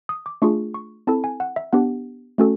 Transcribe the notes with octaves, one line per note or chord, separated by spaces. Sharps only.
D#6
D6
A3 D4 F4 G#4 C#6
C#6
C4 E4 A4 A5
G#5
F#5
E5
B3 D4 G4 F#5
A3 C#4 F#4 A4